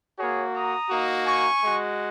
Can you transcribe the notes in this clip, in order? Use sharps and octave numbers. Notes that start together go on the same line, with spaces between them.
A#3 F#4 G#4 C#5
A#5 D#6
A#3 D#4 F#4
G#5 C#6
G#3 F#4